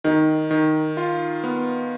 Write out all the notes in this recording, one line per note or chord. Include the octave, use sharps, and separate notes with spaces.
D#3 D#4
D#3
F4
B3